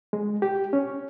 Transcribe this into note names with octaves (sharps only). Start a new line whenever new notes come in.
G#3
G4
C#4